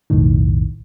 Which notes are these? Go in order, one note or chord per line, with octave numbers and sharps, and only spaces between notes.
B1 F2 A2 D#3